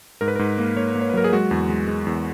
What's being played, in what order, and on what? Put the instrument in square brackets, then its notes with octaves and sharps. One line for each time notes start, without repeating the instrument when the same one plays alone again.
[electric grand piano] G#2 A#4
B4
G#2 A#4
A#3
A#3 C#5
A#3
C#5
B4
F#3 A#4
G#4
G#3 F#4
E2
G#3
G#3
E2